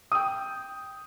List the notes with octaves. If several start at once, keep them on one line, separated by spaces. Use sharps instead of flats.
G5 D#6